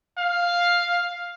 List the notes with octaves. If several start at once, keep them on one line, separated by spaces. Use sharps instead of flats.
F5